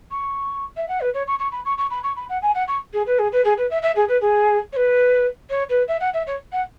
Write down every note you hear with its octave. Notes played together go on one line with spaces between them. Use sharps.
C#6
E5
F#5
B4
C#5
C#6
C#6
B5
C#6
C#6
B5
C#6
B5
F#5
G#5
F#5
C#6
G#4
B4
G#4
B4
G#4
B4
E5
E5
G#4
B4
G#4
C#5
B4
C#5
B4
E5
F#5
E5
C#5
F#5